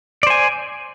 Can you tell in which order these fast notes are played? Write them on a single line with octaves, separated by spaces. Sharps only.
D5 C5 G#5